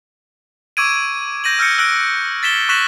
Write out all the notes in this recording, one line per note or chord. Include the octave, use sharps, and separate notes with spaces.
C#6 D6 E6 G#6 D7 D#7
G6 A#6 D#7 F#7
E6 F6 G6 A#6 C#7 D7
E6 F#6 A#6 D7
A6 B6 E7 G7
C#6 F#6 A#6 B6 E7 F#7